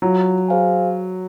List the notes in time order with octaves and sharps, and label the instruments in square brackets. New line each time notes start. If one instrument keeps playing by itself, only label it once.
[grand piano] F#3 [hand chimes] F4
[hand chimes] G#4 C5 F5 G#5